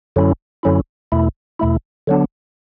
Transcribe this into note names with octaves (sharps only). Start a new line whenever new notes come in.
F#2 D3 F#3 C#4 E4
F#2 D3 F#3 C#4 E4
E2 B2 A3 E4
E2 B2 A3 E4
D3 F#3 B3 D4